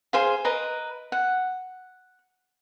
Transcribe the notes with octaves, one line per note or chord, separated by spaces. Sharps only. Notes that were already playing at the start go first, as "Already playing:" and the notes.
G#4 C5 F5
A#4 B4 D#5 A#5
F#5